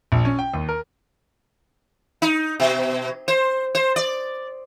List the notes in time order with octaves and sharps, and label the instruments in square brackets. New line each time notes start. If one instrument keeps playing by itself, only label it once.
[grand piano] A#1
C#4
G5
D#2
A#4
[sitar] D#4
B2
C5
C5
D5